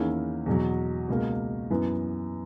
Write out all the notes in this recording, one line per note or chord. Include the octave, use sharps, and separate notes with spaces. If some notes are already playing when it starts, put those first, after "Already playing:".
Already playing: E2 D#3 A#3 C#4 E4
E2 B2 F#3
C#2 B2 A#3
F#2 E3 B3